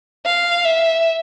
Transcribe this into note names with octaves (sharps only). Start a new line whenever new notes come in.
F5
E5